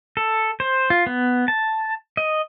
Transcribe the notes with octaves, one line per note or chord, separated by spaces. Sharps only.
A4
C5
F4
B3
A5
D#5